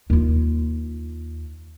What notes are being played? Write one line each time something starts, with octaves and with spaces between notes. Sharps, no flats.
D#2 F4